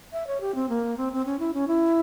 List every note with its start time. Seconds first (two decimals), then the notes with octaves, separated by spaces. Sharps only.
0.13 E5
0.27 C#5
0.41 G4
0.55 C4
0.69 A#3
0.97 C4
1.13 C4
1.26 C#4
1.39 E4
1.54 C#4
1.68 E4